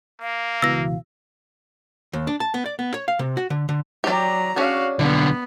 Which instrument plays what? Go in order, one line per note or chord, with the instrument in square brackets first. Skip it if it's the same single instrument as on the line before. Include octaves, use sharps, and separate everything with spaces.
[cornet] A#3 [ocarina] F5
[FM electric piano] C#2 B2 E3 [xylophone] E6 A#6
[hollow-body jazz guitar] D#2
D4
A5
B3
D5
B3
C#5
F5
C3
F#4
D3
D3
[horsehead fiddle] F#3 A#5 [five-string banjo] G4 D5
[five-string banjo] C#4 D4 G#4 [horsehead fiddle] F#4 F5
[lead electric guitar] B1 D3 [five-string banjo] G3 [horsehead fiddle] B3